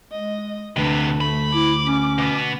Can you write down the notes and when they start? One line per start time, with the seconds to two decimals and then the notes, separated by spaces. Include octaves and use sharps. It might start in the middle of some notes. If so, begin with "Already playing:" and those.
0.12 G#3 D#5
0.76 D2 C3 B3 D4 B4
1.21 A3 B5
1.54 E4 D6
1.84 C#4
2.18 B2 B3